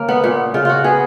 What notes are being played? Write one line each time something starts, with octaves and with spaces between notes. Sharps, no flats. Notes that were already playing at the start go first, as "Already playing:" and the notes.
Already playing: C#3 A#3
B3
A#2 B3
C#3 F4
F4 F#4
B3 G#4